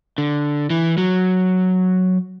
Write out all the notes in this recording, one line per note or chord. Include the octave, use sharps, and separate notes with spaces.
D3
E3
F#3